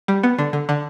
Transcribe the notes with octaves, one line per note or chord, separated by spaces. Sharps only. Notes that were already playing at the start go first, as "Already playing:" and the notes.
G3
B3
D3
D3
D3